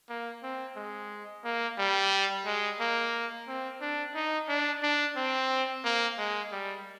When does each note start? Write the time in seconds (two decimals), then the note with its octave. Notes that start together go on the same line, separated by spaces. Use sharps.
0.09 A#3
0.43 C4
0.76 G#3
1.44 A#3
1.78 G3
2.46 G#3
2.80 A#3
3.47 C4
3.81 D4
4.15 D#4
4.48 D4
4.83 D4
5.16 C4
5.84 A#3
6.18 G#3
6.52 G3